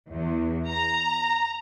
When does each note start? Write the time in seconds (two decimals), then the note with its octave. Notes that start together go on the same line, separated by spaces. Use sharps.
0.11 E2
0.69 A#5